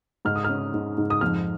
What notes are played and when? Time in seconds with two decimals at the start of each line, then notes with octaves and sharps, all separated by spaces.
0.25 G#2 F6
0.36 D#6
0.44 F6
0.50 C#4
0.74 G#2
0.98 G#2
1.10 D#6
1.21 F2 F6